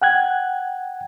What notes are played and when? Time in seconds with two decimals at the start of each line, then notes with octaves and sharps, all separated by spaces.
0.02 F#5 G5 F#6 G#6